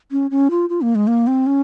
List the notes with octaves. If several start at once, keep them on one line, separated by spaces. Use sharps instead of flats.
C#4
C#4
F4
F4
A#3
G#3
A#3
C4
C#4